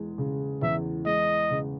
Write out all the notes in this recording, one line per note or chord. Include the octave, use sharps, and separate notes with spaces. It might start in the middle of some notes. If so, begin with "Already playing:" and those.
Already playing: E2 G#3
C#3
E2 E5
G#3 D#5
C#3